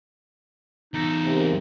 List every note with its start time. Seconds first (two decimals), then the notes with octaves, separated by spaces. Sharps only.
0.94 E2 D#4 A4
1.25 G#2 C3 A#3